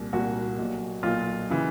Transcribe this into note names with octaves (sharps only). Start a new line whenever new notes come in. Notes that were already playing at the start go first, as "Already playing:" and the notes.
Already playing: C2 A#2
C2 A#2 F#4
B1 A#2
B1 A#2 F4
C#3 E3